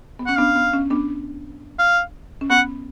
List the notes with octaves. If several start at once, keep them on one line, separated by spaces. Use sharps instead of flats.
B3
C#4 F#5
B3 D4 F5
B3
C#4
B3 D4
F5
C#4
B3 F#5